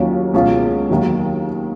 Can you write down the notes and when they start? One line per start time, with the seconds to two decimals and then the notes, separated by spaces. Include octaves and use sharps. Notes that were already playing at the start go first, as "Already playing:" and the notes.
Already playing: D#2 D#3 F#3 C#4 F4
0.34 C#2 B2 G#3 C#4 F4
0.90 D#2 D#3 F#3